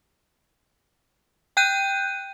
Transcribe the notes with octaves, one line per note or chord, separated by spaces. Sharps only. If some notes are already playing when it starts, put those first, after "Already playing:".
G5 F#6 G6 D#7